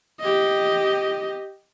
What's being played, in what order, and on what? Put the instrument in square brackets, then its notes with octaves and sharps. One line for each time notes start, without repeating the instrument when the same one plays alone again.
[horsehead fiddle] G4 D#5